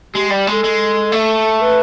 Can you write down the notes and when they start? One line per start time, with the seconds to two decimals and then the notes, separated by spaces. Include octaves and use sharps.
0.14 G#3 G4
0.30 G3
0.47 G#3 A4
0.64 G#3
1.12 A3
1.61 B4